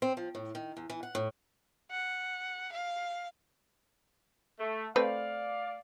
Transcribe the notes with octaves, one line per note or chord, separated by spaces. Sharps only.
C4
F3
A2
D#3
E2
E3
F#5
A2
F#5
F5
A3
A3 C4 B4 D5 F5